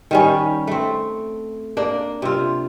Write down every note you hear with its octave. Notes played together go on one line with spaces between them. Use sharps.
D#3 G3 C#4
A3 C4
A#3 D4
C3 F4